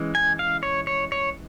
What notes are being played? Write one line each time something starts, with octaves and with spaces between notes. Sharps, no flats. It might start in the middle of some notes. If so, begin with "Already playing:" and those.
Already playing: E3 G#3 C#4
G#5
F5
C#5
C#5
C#5